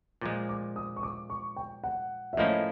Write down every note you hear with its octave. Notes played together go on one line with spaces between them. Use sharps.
A#2 F3 G#3 D6
D6
D#6
C#6
D6
C#6
G5
F#5
E5
A2 F3 A#3 C#4 E4 D#5